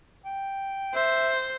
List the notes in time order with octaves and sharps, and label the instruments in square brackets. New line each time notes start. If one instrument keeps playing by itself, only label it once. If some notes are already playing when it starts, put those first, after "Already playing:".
[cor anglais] G5
[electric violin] C5 [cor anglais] E5